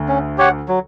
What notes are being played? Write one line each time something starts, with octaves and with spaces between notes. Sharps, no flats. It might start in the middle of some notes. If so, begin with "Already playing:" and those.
Already playing: D2 D3
C#4
G4 C#5 F#5
F#3